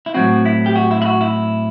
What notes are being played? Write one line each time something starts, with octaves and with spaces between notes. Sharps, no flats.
E4
A2 F#3 C4 F#4
E4
G4
F#4
E4
E4
F#4
E4